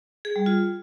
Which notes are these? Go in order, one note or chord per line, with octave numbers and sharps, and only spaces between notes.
G#4
G3
F4